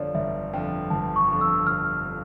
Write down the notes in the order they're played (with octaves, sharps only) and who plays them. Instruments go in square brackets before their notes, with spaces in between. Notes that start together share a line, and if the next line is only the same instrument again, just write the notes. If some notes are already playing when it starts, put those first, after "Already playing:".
Already playing: [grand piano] G1 F2 D3 F3 [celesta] C#5 D5
[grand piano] G1 [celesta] E5
[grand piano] F2 D3 F3 [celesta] G5
[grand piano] G1 [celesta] A5
[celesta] C#6
[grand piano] F2 D3 F3
[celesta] E6
[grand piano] G1 [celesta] F6
[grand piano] D3 F3